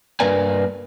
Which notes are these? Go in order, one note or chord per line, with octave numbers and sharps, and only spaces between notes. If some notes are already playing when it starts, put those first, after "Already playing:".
G2 A#3 B4 D5 G#5